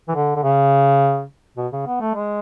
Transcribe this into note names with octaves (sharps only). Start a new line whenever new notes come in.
E3
D3
D3
C#3
B2
C#3
B3
A3
G#3